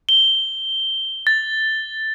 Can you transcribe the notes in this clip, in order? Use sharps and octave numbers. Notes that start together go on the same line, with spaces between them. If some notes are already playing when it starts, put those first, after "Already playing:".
G7
A6